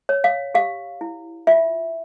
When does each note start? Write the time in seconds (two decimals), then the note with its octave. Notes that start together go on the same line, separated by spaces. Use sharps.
0.09 C#5
0.24 F5
0.55 G4 F5
1.01 E4
1.47 F4 E5